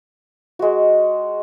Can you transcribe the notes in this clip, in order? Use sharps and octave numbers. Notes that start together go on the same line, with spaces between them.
G#3 F#4